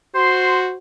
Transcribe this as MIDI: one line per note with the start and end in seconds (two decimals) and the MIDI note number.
0.15 0.77 66
0.15 0.73 72
0.15 0.58 84